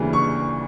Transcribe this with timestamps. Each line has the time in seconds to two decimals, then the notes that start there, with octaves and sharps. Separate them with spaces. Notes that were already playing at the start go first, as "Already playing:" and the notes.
Already playing: D2 C#3 E3 G3 A#3
0.13 C#6